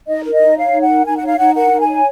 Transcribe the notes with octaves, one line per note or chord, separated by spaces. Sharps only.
D#4 D#5
A#4
D#5
D#4
C#5 F5
D#4
F#5
A#4
D#4 G#5
F#5
C#5 F5
D#4 F#5
A#4 F#5
D#4
G#5
C#5